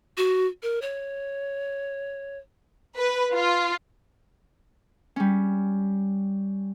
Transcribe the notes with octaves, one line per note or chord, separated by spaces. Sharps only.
F#4
A#4
C#5
B4
F4
G3 C#4